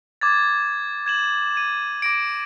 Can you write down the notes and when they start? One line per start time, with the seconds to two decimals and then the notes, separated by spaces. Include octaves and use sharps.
0.21 D6 G#6 A6
1.06 G#6 E7 F#7
1.54 G#6 D#7
2.02 D6 A#6 D7